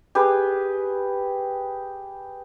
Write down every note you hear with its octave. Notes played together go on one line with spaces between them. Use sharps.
G4 G#4 B4